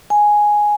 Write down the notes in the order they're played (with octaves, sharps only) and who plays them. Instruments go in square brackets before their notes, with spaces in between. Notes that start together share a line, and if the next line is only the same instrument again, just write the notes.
[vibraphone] G#5